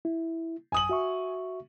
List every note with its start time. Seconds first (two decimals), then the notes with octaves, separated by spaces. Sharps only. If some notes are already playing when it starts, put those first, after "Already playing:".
0.05 E4
0.72 F#2 G#5 D#6 F#7
0.89 F#4 E5 C#6